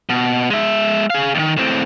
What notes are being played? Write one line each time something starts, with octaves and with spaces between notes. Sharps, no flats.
B2
G#3 E5
G#4 F5
D#2 D#3
A2 C4